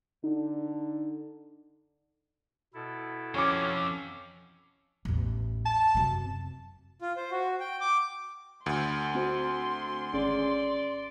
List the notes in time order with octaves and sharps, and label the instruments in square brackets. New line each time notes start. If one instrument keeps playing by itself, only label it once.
[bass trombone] D3 [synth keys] D#4
[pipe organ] B2 E4 A4
[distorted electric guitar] F2 [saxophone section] C#4 [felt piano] C#6 D6
[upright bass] A1 E2
[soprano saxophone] A5
[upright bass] F#2 C3
[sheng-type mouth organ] F4
C5
F#4
G5
D6
[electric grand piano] D2 [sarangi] C6
[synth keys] C4 F#4 C5
[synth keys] G#1 C#4 G#4 [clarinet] D5